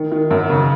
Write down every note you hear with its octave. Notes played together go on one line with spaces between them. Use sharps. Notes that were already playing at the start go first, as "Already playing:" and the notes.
Already playing: D#3
D#3
F#2
C#3